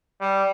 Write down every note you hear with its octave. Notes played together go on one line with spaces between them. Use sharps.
G3